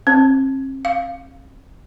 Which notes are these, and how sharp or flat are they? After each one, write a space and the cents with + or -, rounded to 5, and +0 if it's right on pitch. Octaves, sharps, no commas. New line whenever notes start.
C4 +40
F5 -5